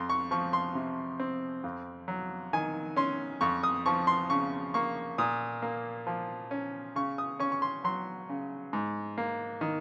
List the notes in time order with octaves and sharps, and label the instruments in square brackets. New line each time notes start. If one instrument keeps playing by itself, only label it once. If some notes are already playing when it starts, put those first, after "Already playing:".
Already playing: [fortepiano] F2 C6
C#6
F3 C#6
C6
C3
C4
F2
F#3
D#3 G#5
C#4 C6
F2 C#6
D#6
F3 C#6
C6
C#3 C#6
A#3 C#6
A#2 D#6
A#3
F3
C#4
C#3 C#6
D#6
C#4 C#6
C#6
C6
F#3 C6
C#3
G#2
A#3
D#3